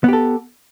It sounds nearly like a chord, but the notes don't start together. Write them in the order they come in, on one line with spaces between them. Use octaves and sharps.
B3 G4 A4